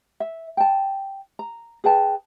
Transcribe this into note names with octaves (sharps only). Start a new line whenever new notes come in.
E5
G5 A5
A#5
G#4 B4 G5 A5